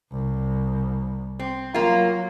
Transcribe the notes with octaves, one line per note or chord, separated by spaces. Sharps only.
C2
C4
F#3 A#3 F4